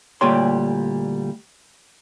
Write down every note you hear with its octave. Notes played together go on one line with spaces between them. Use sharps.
D2 A#2 G3 G4 C#5 C6